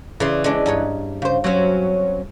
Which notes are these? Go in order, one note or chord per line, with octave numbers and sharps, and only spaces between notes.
C#3 E3 D5 C6
G#3 C#4 D4
G2 D#4 C#5
C#3 C5
F#3 C4 C#4